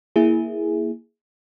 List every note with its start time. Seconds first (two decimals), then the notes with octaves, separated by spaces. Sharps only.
0.16 A#3 E4 G#4